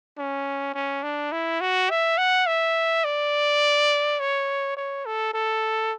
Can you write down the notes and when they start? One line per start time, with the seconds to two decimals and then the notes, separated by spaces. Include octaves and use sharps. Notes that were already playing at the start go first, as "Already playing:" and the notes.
0.18 C#4
0.74 C#4
1.03 D4
1.32 E4
1.61 F#4
1.90 E5
2.18 F#5
2.47 E5
3.04 D5
4.20 C#5
4.76 C#5
5.06 A4
5.33 A4